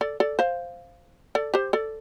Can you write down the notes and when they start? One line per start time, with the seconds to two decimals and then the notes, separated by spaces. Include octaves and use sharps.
0.01 A4 D5
0.20 A4 D5
0.39 C5 F5
1.35 A4 D5
1.54 G4 C5
1.73 A4 D5